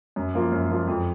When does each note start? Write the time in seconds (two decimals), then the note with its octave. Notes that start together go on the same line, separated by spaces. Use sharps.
0.16 F#2
0.34 F3 A#3 F4
0.52 F#2
0.70 F3 A#3 F4
0.87 F2